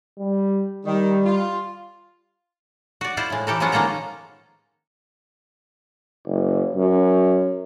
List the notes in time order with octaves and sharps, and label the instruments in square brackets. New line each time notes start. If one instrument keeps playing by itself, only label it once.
[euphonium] G3
[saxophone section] D#3 [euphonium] G3
[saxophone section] F4
[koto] F#4 D5
E4 F4 C5 D5
A2 G#3
E3 G4 A4 A#4
F3 F#3 G#3 B3 C#4 F4
D#3 G#3 A#3 F4 A4 A#5
[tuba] F#1
F#2